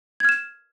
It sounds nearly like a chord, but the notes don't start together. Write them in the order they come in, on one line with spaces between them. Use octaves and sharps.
G#6 F6 E7